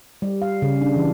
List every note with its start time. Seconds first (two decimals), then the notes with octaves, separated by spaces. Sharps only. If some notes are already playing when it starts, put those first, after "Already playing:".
0.22 G3
0.42 F5
0.62 C#3
0.81 D4
0.96 E3